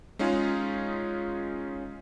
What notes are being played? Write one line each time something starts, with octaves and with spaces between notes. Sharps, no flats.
G#3 C#4 D#4 F4 G#4